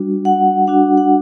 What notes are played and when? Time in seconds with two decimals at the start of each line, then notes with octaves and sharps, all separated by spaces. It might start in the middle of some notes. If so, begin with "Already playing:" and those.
Already playing: G3 D4 F#4
0.25 F#5
0.67 G3 D4 F#4 F#5
0.97 F#5